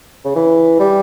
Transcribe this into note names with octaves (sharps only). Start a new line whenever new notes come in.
C#3
E3
G3